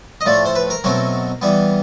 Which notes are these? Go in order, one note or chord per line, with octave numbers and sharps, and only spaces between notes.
D#5
A2 F3 A3 D5
C5
B4
A#4
B2 F#3 A3 C4
E3 G3 B3